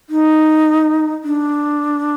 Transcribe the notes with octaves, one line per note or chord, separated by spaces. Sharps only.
D#4
D4